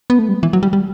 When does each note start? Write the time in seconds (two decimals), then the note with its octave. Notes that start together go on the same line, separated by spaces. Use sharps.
0.10 B3
0.19 A3
0.29 G3
0.43 E3
0.53 F#3
0.63 G3
0.73 G3